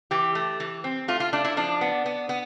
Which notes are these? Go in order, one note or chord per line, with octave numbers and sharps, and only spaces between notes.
E3 G4
A3
E3
C4
A3 F4
F4
A3 D4
E4
F3 D4
B3
B3
B3